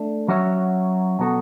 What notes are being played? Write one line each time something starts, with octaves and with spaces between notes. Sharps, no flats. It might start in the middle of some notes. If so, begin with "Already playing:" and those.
Already playing: A3 D4
F#3 C#4 F#4 C#5 E5
B2 F#3 B3 F#4 A4